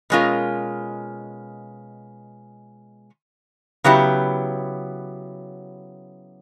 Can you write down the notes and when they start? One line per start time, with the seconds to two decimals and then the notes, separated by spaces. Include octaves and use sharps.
0.10 B2 G#3 C#4 F4 A#4
3.84 C#3 F#3 B3 E4 G4